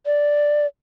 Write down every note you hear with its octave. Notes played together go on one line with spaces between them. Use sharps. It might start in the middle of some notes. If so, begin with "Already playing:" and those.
D5